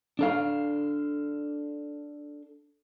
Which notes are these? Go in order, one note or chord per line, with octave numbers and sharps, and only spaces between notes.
D4 A4 F5